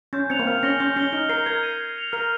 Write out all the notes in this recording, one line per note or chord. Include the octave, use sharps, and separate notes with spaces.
C#4 G6
C4 C#7 F7
A#3
C4 F6
C#4 A#6 C#7 G7
C#4 G6
C#4 C#7 G7
D#4 F6
A#4 C7 G7
A#4 G#6
C7 D#7
G#6
C#7 F7
A#4 F6